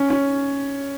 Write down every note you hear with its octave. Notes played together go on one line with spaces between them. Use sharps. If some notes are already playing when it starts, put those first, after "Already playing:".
Already playing: C#4
C#4